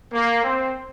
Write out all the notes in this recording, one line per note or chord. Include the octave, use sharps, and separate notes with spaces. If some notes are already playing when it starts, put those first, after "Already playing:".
A#3
C4